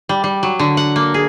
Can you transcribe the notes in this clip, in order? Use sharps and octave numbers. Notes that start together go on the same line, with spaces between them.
G3
G3
F#3
D3
F#5
A#3
G#4